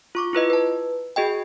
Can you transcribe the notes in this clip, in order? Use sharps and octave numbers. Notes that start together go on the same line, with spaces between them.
F4 C#6 D6
E4 F4 B4 D#5
B4 A5
F#4 G#4 D#5 G5